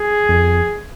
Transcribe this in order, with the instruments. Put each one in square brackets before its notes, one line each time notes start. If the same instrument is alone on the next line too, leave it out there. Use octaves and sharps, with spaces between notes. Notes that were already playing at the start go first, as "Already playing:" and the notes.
Already playing: [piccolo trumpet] G#4
[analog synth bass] F2